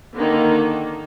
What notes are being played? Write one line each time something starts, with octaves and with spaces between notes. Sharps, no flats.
D3 D#3 A#3